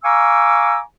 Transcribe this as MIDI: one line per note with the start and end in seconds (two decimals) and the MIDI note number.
0.04 0.80 77
0.04 0.80 80
0.04 0.80 82
0.04 0.80 85
0.04 0.80 86
0.04 0.80 88